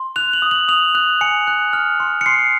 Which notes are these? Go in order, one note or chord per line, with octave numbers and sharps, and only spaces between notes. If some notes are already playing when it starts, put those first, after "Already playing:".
Already playing: C6
F#6 F7
F#7
D#6
F#7
D#6 F7
F#6 F7
G#5 C#7
F#6
F6
C6
C#7
C6 C7